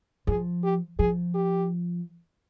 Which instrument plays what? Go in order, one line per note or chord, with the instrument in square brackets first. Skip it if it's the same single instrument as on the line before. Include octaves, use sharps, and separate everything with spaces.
[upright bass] F3 [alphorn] G#4
[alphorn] G4
[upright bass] F3 [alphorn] G#4
[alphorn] G4